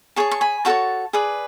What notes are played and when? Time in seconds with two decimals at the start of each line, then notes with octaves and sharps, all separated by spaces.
0.16 G#4 C#5 A5 C#6
0.31 C#6
0.41 G#5 B5
0.65 F#4 A4 C#5 A5 C#6
1.13 G#4 B4 D5